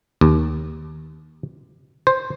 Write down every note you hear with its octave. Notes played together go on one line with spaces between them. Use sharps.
D#2
C5